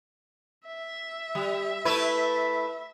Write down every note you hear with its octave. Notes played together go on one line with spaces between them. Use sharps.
E5
G3
A3 E4 B4